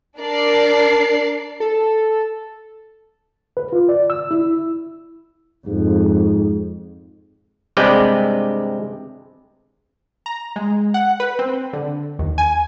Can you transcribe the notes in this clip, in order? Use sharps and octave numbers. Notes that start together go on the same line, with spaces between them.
D4 A#4 D5 C7
A4
B4
F4
D5
E6
E4
F2 G#2
G2 C3 G#3 B4 D5 G5
A#5
G#3
F#5
B4
C4
D3
D#2
G#5